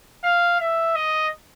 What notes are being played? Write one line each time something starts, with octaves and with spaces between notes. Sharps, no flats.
F5
E5
D#5